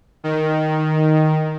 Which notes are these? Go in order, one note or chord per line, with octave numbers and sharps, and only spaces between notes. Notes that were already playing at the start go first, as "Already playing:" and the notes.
D#3